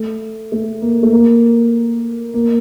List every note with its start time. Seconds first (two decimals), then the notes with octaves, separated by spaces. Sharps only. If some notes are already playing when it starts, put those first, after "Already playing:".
Already playing: A3
0.52 A3
0.82 A#3
1.03 A3
1.12 A#3
2.34 A#3